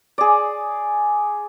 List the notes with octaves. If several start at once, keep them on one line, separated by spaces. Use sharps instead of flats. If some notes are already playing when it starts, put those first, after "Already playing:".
G#4 D5